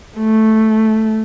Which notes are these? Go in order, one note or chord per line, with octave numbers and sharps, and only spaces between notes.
A3